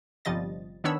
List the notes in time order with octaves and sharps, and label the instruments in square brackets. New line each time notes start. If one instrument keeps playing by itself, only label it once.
[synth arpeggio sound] G1 C3 F3 G3 D#5 A6
D#3 B3 D4 C#5 B5 E6